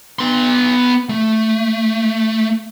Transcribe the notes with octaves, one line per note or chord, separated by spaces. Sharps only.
B3 C6
A3